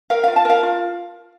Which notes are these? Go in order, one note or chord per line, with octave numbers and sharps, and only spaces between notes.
A#4 F5
F4 F5
A5
A#4 F5
F4